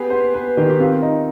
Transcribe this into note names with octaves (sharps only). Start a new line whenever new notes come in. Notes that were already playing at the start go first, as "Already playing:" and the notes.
Already playing: B3 G4 G#4 B4
B3 C5
B3 B4
D#3 G4
G4
C4 F4
D#4